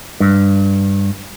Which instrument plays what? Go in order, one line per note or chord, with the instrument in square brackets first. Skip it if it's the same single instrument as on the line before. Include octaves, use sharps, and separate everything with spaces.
[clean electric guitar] G2